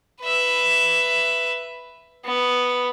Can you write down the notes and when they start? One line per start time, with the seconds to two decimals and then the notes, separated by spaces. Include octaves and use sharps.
0.21 B4 E5
2.24 B3